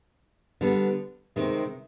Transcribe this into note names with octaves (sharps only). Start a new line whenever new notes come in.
D3 G3 B3
C3 D#3 G#3 C4